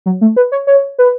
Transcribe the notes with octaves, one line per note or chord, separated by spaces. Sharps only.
F#3
A3
B4
C#5
C#5
B4